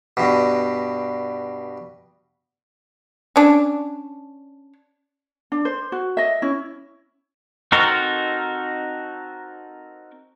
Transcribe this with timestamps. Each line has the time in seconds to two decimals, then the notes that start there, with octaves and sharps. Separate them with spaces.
0.17 G2 B2
3.36 C#4 D4
5.52 D4
5.65 C5
5.92 F#4
6.17 D#5 E5
6.42 C#4 E4
7.72 C4 D#4 F#4 A4 A#4